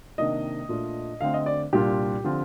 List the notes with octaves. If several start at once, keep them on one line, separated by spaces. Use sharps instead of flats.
C3 D#3 A#3 D4 D#5
A#2 A3 D4 F4
D3 A3 C4 F5
D#5
D5
C2 A#2 G3 D4 F4 G4
D3 F3 C4 F4